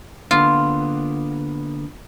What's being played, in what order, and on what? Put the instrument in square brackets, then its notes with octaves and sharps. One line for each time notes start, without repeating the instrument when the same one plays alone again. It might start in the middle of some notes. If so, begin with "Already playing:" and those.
[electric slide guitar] D3 A#3 B3 [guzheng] F4